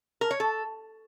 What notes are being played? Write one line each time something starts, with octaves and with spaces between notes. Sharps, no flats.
A#4
C#5
A4